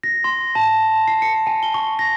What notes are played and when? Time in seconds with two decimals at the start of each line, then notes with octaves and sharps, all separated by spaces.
0.03 A#6
0.24 C6
0.55 A5
1.08 C7
1.22 C#7
1.47 G#5
1.63 G7
1.74 C#6
1.99 A#6